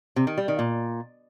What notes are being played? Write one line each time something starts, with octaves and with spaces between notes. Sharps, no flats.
C3
D#3
G3
D#3
A#2